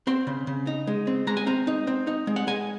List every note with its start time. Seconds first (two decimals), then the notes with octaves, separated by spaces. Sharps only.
0.07 C4 C6
0.27 C#3
0.47 C#3
0.67 D#4
0.87 G#3
1.07 C4
1.27 G#3 A#5
1.37 G#5
1.47 C4 A#5
1.67 D#4
1.87 C4
2.07 D#4
2.27 G#3
2.36 F#5
2.47 G#3 G#5